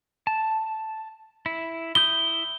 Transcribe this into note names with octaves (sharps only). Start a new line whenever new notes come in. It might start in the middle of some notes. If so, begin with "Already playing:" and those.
A5
E4
E4 D#6 G6 G7